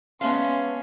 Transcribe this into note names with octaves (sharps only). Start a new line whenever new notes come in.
G#3 B3 C#4 E5 F5 A5 C6